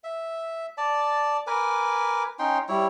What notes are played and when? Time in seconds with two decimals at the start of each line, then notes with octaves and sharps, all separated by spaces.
0.04 E5
0.78 D5 A5
1.47 A#4 B4 G#5 D6
2.39 C#4 D#4 G5 C6
2.69 G3 E4 C#5